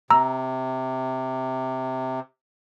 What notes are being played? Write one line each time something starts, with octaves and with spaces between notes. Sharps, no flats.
C3 A#5 E6